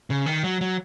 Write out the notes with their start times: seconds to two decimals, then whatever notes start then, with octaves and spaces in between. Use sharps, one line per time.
0.10 C#3
0.26 D#3
0.43 F#3
0.61 F#3